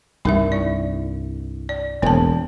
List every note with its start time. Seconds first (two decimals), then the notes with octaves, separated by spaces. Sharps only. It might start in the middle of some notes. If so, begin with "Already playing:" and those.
0.25 C2 G2 D#4 A#4 E5
0.52 E4 D5
1.69 D5
2.02 E1 E2 A#3 B3 A5